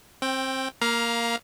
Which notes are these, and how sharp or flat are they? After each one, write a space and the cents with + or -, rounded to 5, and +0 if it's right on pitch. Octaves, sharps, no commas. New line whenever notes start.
C4 +20 G5 +0
A#3 +0 F5 +0 A#5 +25